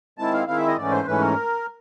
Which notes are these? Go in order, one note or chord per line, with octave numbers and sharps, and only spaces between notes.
D#3 G#3 C4 E4 A5
F5
D#3 G#3 C4 E4 F5
E5
D#5
G#2 E3 A3 C#4 D5
C5
G#2 E3 A3 C#4 B4
A#4